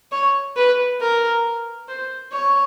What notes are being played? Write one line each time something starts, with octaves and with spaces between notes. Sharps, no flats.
C#5
B4
A#4
C5
C#5